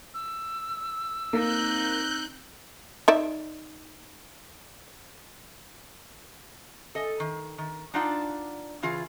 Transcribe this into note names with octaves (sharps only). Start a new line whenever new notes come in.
E6
A#3 C4 D#4 F#6 G6
D#4 D5 E5
A4 D#5 G#5
D#3
D#3
D4 D#4 F4 D5 F#5 A5
C#3 E3 F4 G#4